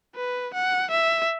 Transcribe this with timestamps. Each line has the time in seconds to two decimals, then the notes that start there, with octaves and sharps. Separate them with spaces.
0.15 B4
0.54 F#5
0.91 E5